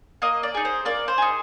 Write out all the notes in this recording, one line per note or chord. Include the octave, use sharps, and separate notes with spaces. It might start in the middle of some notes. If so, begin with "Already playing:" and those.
A#3 D#5
D5
D#4 G#4
C5
A#3 D5
C5
D#4 G#4